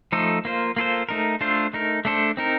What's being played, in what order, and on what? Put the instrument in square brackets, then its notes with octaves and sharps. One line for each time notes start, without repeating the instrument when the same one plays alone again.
[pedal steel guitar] F3 A3 D#4 A4 C5
A#3 F4 C5
A#3 F4 A4 C5
A3 D#4 A#4
A3 D4 F4 A4 C5
A3 D#4 A#4
A3 D4 A4 C5
C4 D#4 A#4